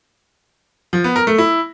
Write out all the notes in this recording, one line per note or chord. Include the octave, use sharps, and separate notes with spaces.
F3
B3
A#4
A3
E4